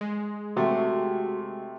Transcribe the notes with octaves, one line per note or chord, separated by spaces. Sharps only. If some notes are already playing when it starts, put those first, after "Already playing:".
G#3
C3 A3 F#4